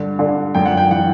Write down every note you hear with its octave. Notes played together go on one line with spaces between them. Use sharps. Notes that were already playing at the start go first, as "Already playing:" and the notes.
Already playing: G2 D3
D3
F#2 G5
F#5
G5
E3 F#5